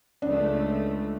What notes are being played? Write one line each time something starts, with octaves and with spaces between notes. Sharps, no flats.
C#2 A3 D4